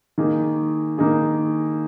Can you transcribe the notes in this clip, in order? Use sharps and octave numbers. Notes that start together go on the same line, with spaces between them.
D#3 A#3 D#4 G#4
D#3 A#3 D#4 G#4